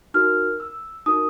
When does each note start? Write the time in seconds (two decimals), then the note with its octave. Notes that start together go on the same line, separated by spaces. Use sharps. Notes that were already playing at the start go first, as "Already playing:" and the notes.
0.14 D#4 F#4 A#4 F6
0.60 E6
1.06 D#4 F#4 A#4 D#6